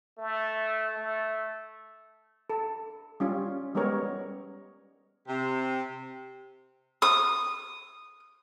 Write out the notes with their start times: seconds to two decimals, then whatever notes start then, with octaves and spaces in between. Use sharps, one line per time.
0.18 A3
0.97 A3
2.50 A4
3.20 G3 C#4 F4
3.75 G3 G#3 B3 C#4 A#4 C#5
5.28 C3
7.02 D#6